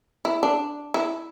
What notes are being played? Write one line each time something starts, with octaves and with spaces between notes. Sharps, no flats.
E4
D4
E4